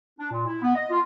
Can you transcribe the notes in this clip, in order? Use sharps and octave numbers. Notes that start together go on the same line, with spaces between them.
D4
A#2
E4
B3
D#5
F4